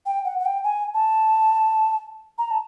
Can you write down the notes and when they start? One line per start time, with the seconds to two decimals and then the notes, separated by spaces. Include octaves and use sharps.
0.06 G5
0.25 F#5
0.39 F#5
0.45 G5
0.64 G#5
0.94 A5
2.38 A#5
2.51 A5